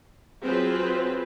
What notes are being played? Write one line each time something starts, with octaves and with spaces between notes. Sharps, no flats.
F#3 C4 F4 G#4 B4 C5